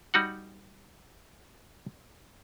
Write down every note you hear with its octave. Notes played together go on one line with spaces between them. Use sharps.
G3 D#4 F#4 F#5